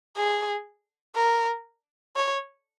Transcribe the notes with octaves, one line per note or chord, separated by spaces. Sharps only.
G#4
A#4
C#5